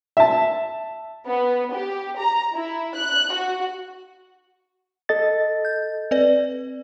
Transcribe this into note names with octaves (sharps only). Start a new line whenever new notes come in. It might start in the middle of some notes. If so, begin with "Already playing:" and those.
E5 A5
B3
G4
A#5
E4
F#6
F#4
A4 D#5 A6
G6
C4 B4 D5